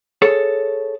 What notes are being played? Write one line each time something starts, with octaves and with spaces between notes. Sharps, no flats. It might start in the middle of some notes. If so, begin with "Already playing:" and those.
G#4 A4 C#5